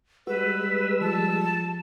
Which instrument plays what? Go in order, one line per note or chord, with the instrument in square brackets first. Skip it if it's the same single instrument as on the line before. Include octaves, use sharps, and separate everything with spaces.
[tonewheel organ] G3 G#3 E6 [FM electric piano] F#4 [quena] B4
[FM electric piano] F3 [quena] A5